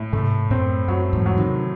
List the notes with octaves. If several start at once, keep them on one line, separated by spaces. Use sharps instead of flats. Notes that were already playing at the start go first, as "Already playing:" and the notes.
Already playing: A2
G#2 C3 A3
F#2 A2 C4
F#2 F#3
E2 G#2
F#3
C3 D#3